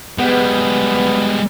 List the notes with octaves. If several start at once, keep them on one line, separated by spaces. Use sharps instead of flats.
G3 G#3 B3